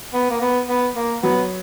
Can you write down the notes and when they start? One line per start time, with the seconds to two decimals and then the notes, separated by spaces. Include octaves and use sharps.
0.13 B3
0.30 A#3
0.41 B3
0.68 B3
0.95 A#3
1.23 F#3 B3